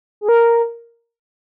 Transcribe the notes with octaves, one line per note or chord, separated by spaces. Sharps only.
G#4
A#4